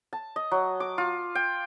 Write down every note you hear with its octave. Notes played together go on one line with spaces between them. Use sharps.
A5
D#5
F#3
D6
F4
G5